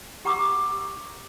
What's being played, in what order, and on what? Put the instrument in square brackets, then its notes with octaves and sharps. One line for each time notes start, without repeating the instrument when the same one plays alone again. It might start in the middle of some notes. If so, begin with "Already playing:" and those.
[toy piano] G4 F#5 A#5 C#6 D6 E6